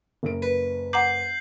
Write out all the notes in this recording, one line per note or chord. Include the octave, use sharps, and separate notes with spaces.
F#1 A#4 D7
B4
F#5 A#5 D6 G6 C7 F#7